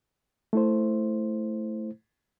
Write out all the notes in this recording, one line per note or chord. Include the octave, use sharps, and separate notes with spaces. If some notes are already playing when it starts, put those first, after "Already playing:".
A3 E4 C5